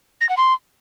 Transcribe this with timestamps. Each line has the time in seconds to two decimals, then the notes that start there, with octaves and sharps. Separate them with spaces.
0.21 A#6
0.29 F#5
0.37 C6